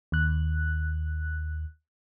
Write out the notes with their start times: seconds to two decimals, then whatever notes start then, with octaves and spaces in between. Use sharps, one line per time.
0.12 D#2 F#6